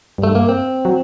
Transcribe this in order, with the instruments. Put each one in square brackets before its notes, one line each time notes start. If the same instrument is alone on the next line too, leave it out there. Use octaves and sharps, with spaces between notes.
[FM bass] G2
[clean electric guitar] A3
A#3
C4
[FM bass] F#3